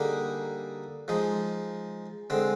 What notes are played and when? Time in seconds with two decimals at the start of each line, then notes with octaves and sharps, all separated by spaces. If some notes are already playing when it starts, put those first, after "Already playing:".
Already playing: D3 G3 A#3 D#4 G#4
1.08 F3 G#3 D#4
2.30 D3 G#3 C4